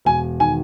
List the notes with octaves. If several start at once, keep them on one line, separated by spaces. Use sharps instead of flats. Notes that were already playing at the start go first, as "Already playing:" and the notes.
E1 G#5
D#3 G#5